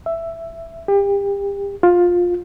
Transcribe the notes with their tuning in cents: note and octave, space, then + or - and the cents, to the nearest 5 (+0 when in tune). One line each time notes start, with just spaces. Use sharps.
E5 +10
G4 +30
F4 +15